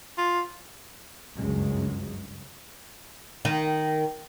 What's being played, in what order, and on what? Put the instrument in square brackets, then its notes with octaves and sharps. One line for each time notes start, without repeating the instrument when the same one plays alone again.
[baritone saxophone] F4
[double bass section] F#1 C#2 G2 C#3 F#3 G#3
[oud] D#3